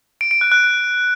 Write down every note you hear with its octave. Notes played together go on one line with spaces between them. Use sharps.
D7
D7
F#6
F#6